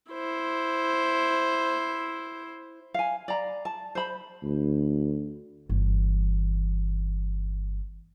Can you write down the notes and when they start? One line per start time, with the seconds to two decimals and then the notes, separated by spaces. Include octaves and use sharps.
0.11 E4 C5
2.94 F5 G#5
3.28 D5 A#5 B5
3.65 A5
3.95 C5 B5
4.43 D2
5.69 G1 E3